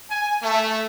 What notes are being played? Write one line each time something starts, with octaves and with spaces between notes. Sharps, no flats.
G#5
A3